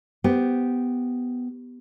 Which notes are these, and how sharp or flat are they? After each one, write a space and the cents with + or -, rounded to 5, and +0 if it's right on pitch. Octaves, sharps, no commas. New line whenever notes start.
B3 +5 G4 +0 C5 -10